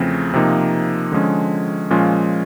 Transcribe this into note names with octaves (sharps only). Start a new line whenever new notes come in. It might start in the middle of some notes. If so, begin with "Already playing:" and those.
Already playing: E2 C#3 F3 A3 C4
C3 F3 A#3 D#4
D3 F3 G#3 C#4
A#2 F3 G#3 C#4 F4